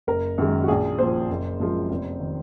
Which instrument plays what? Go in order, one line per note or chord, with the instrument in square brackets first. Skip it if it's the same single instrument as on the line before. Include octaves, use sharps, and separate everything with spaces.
[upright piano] F#1 A#4
F#2 D#3 G#3
F#4
A#1 G#4
A#2 F3 C5
F#1
F#2 F3 G#3
F1
D#3